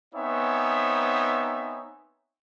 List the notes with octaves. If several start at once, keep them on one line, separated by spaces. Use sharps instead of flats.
B3 C4 D#4 C#5 E5 G#5